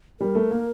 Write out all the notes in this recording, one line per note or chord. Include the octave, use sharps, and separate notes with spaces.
G3 A#4
A3
A#3